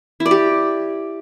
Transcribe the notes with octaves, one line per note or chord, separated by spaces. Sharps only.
E4
D5
G4